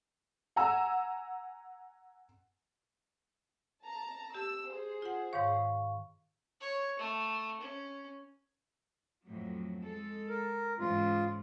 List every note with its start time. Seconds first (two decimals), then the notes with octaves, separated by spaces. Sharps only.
0.56 F#5 G#5 A#5 E6
3.83 A5 A#5
4.35 G4 E6
4.69 G#4 C5
5.02 F4 F#5
5.33 G#2 D#3 C#5 F5 C#6
6.61 C#5
6.99 A3
7.61 C#4
9.26 F2 A2 F#3
9.81 G#3 A4
10.29 A#4
10.79 G#2 C#3 E3 F4